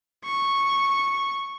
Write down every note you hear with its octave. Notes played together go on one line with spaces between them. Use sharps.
C#6